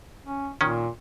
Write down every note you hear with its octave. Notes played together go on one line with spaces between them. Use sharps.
C#4
A#2 D#3 C#4